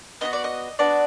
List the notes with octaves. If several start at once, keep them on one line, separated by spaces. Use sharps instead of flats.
B3 D4 F#4 D#5
D5
D#5
B3 D4 F#4 D5